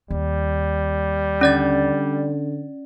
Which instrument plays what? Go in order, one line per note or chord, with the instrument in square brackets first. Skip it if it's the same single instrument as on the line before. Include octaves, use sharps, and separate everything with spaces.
[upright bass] D#2 [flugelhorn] G3
[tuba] D3 [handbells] C#4 D5 A6